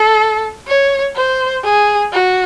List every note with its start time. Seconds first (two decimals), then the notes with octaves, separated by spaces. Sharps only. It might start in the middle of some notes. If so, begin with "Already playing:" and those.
Already playing: A4
0.68 C#5
1.16 C5
1.64 G#4
2.13 F#4